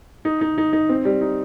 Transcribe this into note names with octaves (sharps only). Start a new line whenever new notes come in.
D#4
D#4
D#4
D#4
C4
G3
D#4